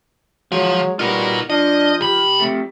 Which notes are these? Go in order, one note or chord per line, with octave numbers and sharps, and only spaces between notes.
F3 F#3 G#3
G3 D#4 F4 F#4 A#4 B4
F3 D4 D#5
C#2 G4 B5
F2 A3